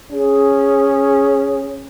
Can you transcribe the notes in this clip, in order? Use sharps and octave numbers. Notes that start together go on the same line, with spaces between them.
C#4 G#4